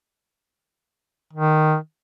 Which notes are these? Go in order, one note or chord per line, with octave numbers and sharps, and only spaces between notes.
D#3